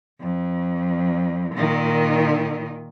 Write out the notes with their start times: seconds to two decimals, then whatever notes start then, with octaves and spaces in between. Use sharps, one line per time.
0.20 F2
1.55 A#2 D#3